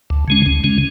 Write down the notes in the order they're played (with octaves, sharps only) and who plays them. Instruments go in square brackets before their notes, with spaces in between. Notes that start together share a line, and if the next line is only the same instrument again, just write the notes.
[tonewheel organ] D2
C#3 G#3 C#4
D2
C#3 G#3 C#4